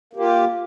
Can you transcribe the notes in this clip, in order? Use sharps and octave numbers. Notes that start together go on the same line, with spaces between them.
A#3 F4 G4